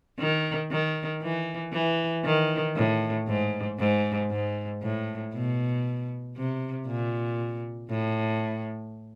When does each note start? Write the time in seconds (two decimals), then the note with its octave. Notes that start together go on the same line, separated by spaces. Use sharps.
0.19 D#3
0.71 D#3
1.22 E3
1.73 E3
2.25 D#3
2.76 A2
3.28 G#2
3.80 G#2
4.31 G#2
4.82 A2
5.34 B2
6.37 C3
6.87 A#2
7.90 A2